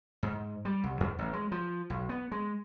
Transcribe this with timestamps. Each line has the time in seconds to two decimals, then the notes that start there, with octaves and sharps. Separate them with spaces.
0.23 G#2
0.65 G3
0.84 C2
1.00 E2
1.19 A1
1.33 G#3
1.52 F3
1.90 B1
2.09 B3
2.32 G#3